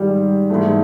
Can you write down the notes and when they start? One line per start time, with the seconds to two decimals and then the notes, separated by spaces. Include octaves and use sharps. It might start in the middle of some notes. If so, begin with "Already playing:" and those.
Already playing: G#2 D#3 G3
0.50 G#2 E3 A3